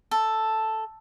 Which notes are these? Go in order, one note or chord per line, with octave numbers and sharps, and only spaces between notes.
A4